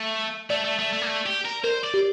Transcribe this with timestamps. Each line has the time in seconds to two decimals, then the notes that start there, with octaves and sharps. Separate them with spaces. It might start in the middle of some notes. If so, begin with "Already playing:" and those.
Already playing: A3
0.50 A3 D5
0.64 A3
0.79 A3
0.93 A3
1.02 A#3
1.07 A3
1.26 G4
1.45 A#4
1.64 A#4 C5
1.84 D5
1.94 G4